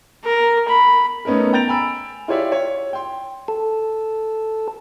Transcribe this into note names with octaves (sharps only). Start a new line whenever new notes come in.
A#4
B5
A3 B3 C#4 D#4 A#4
G5 A#5 G6 A6 D7 F7
G#5 B5 E6 D7
E4 F4 G4 C#5 D5 E5
C#5
G5 C6
A4